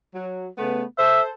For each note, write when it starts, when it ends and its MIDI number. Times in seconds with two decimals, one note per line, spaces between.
0.13 0.48 54
0.58 0.84 49
0.58 0.84 57
0.58 0.84 59
0.98 1.32 69
0.98 1.32 72
0.98 1.21 76